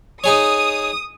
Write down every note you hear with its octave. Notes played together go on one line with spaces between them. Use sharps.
D#4 G#4 C#5 D#6